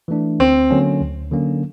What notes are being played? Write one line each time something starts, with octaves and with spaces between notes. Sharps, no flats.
E3 A3 D4
D2 C4
D3 F#3 A#3 C#4
D2
D3 F#3 A#3 C#4